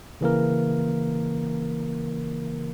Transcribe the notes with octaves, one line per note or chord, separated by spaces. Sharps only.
C#3 E3 A#3 A#4